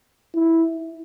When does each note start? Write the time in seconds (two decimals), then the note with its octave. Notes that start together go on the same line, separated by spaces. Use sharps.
0.34 E4